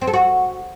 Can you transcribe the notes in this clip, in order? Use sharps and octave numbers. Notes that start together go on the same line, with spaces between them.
C4
A4
F#4